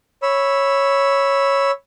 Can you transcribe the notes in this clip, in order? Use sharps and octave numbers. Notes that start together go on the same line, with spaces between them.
C#5 B5 E6